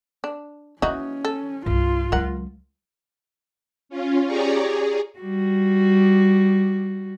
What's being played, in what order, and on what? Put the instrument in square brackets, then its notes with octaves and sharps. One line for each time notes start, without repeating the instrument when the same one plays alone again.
[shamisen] D4
[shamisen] E3 D#4 F#4 [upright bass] A#3 [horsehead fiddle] C#4
[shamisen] A4
[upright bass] C2 G2 [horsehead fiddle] F4
[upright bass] C#2 F#3 [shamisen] A#4 F#5
[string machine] C#4 F4
G4 G#4 C#5 D5 A#5
G#4
[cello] G3 F#4